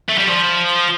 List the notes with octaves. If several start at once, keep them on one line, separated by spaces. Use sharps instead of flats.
A3
G3
F3